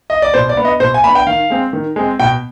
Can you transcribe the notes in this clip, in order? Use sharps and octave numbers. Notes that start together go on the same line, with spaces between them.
D#5
D5
B2 C5
D5
B3 D4
D#5
B2 C5
G#5
B3 D4 B5
G5
D#3 F5
G#3 C4
D#3
G#3 C4
B2 G5